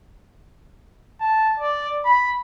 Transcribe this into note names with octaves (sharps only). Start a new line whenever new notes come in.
A5
D5
B5